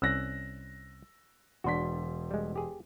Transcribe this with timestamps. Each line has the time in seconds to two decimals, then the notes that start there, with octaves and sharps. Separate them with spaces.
0.02 C2 C#4 E6 F#6 A#6
1.64 E1 D4 F#4 C6 B6
2.31 G3 G#3
2.56 G4 G#4